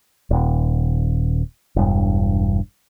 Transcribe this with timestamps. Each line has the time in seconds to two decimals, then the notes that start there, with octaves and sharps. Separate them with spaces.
0.31 D#1
1.76 E1 G2